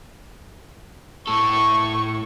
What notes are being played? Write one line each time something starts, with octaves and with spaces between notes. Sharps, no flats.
A2 A4 C#6